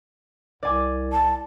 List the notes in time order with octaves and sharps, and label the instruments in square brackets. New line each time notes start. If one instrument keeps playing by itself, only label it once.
[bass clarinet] C2 [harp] D5 G#5 D6
[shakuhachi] A5